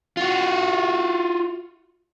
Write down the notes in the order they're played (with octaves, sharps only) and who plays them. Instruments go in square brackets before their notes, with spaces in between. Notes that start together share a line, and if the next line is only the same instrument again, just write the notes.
[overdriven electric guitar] F4 F#4